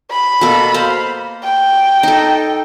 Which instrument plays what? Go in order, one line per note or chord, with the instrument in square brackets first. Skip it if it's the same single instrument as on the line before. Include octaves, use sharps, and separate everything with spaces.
[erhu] B5
[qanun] B2 A#3 A4
C5 F5
[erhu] G5
[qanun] D#4 A4